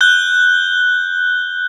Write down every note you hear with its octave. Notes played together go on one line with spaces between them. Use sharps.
F#6 G6 G7